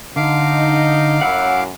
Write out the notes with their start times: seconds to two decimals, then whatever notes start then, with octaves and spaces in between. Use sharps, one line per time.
0.16 D3 D#4 F5 D6
1.21 F#2 E4 F#5